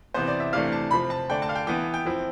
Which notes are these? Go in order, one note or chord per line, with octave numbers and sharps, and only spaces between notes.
C3 E3 B3 C5
D5
E5
C3 E3 A3 D4 F5
A5
C3 F3 C4 B5
A5
D3 A3 D4 G5
A5
F5
G5
E3 B3 E4 G5
G5
F3 C4 E4